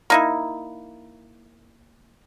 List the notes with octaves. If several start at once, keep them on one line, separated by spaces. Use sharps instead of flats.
A#3 D#4 E4